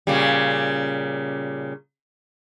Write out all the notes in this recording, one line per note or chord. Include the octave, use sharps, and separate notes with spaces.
A#2 C#3 G3